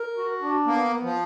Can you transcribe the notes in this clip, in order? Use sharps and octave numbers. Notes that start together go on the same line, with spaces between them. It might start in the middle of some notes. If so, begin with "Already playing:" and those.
Already playing: A#4
F#4
D4
A#3 B3
B3
F3